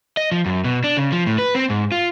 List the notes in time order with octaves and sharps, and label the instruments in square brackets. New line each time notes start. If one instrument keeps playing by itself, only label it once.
[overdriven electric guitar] D#5
F3
F#2
B2
D4
C#3
F3
A2
B4
C4
G#2
F4